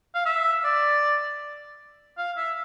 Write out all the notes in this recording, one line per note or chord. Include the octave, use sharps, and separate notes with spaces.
F5
E5
D5
F5
E5